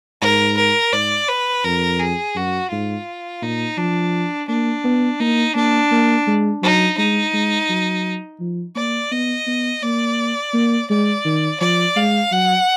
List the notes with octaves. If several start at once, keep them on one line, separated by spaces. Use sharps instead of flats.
G#2 A#4
A#4
G#2 D5
B4
F2 A#4
G#4
F#2 F#4
G#2 F4
A#2 D#4
F3 D4
A#3 D4
B3
A#3 D#4
A#3 D4
A#3
G#3
F#3 D#4
G#3 D#4
G#3
F#3
F3
A#3 D5
B3 D#5
B3
A#3 D5
A#3
G#3 D5
D#3
F3 D5
G#3 F5
F#3 F#5